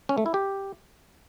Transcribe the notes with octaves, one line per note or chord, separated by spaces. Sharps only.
C#4
A3
E4
G4